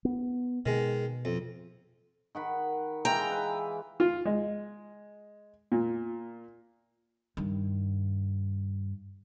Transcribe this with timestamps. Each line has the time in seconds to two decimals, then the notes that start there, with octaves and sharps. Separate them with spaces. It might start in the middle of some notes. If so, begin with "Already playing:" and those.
0.05 B3
0.66 B2 D#3 G#3
1.25 F2
2.35 D#3 F#5 B5
3.05 E3 G#3 F4 G5 A#5
3.30 B4
4.00 F4
4.26 G#3
5.72 A#2
7.37 G2 D#3